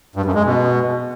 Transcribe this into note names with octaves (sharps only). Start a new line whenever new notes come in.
G2
F#2
G#3
B2